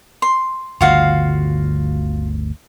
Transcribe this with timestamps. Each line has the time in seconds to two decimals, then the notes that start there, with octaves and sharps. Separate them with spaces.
0.22 C6
0.81 G1 D2 C#3 F4 F#4 F5